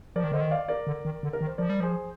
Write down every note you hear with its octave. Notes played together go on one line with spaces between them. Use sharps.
F3 A#4 D5
D#3
D3 C5 D#5
D#3
D5 F5
A#4 D5
D3
D#3
D3
A#4
D#3
C5
F3 A#4 D5
G3
F3 G#4 C5